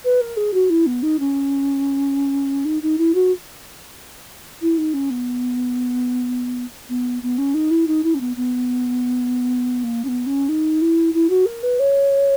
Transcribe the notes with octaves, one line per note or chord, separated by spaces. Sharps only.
B4
A#4
G#4
F#4
E4
B3
D#4
C#4
D#4
D#4
E4
F#4
E4
D#4
C#4
B3
B3
B3
C#4
D#4
E4
D#4
E4
C#4
B3
B3
A#3
C#4
B3
C#4
D#4
E4
E4
F#4
A#4
B4
C#5